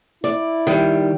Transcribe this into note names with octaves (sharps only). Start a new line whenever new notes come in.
E4 D5
D#3 G3